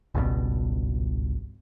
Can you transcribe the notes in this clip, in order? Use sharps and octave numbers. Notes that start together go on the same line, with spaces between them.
G#1 C#2 G2 B2